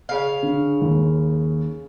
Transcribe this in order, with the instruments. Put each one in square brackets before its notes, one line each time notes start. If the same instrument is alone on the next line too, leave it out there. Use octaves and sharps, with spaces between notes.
[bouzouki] C#3 F5
[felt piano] D3
D#2